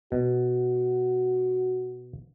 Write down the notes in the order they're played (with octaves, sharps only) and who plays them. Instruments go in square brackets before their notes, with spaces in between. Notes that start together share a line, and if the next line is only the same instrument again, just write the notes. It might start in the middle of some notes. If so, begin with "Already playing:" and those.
[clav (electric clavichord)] B2 [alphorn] F#4